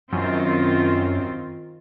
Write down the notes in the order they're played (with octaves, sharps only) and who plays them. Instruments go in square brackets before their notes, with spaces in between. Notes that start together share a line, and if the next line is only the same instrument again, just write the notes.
[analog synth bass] F#2 [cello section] D#3 C4 F4